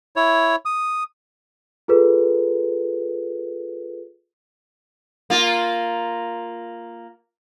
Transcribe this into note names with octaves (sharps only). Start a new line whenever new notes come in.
E4 C#5
D#6
F4 G#4 A4 B4
A#3 F4